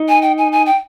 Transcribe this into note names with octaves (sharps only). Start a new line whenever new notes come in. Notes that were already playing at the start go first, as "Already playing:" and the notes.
Already playing: D#4
G#5
G5
G#5
G#5
G5